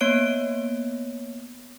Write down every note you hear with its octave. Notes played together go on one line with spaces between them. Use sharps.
A#3 B3 C#5 D7